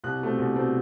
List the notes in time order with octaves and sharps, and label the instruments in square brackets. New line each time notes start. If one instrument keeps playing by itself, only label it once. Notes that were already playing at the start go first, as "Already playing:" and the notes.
[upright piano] C2 F#6
B2 A3 C4
C2
B2 A3 C4